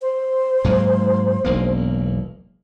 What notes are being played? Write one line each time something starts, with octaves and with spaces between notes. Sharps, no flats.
C5
G#2 F#3 A#3
E1 B1 A#3